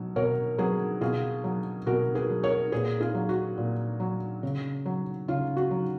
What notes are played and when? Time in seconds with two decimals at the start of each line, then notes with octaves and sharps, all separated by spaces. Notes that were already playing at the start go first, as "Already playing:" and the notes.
Already playing: B2 F#3
0.16 B2 A#4 C#5
0.58 F#3 G#4 B4
1.01 B2 F4 G#4
1.44 F#3
1.86 B2 F#4 A#4
2.15 G#4 B4
2.30 F#3
2.43 A#4 C#5
2.72 A#2 G#4 B4
3.00 F4 G#4
3.15 F#3
3.29 F#4
3.58 A#2
4.00 F#3
4.43 C#3
4.86 F#3
5.28 C#3 F4
5.57 F#4
5.71 F#3